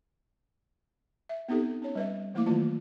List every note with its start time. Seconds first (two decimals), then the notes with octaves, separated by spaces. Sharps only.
1.29 E5
1.48 B3 C4 D#4 G4 A4
1.82 C#4 C#5
1.95 G3 B4 E5
2.34 E3 A3 A#3 E4 F5 D6
2.46 D#3 F#3 A3 F4 A5